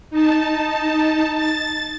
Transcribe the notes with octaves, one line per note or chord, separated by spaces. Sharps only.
D#4 A5
A6